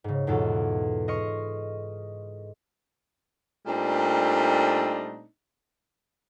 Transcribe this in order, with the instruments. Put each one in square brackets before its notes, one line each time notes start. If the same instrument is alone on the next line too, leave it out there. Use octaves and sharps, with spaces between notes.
[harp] G#2 C#3
E2 G#2 B2 E3 F4 A4
D#5 C6 C#6 F6 C#7
[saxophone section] A#2 G3 A3 C4 D4 D#4